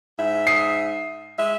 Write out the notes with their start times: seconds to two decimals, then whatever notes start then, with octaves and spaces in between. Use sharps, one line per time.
0.19 G#2 E5
0.47 D#6 C7
1.39 G#3 E5